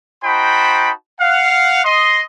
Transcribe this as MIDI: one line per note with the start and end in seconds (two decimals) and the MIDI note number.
0.24 0.90 63
0.24 0.90 66
0.24 0.90 72
0.24 0.90 79
0.24 0.90 81
0.24 0.90 83
1.21 1.81 77
1.21 1.81 78
1.84 2.22 75
1.84 2.22 84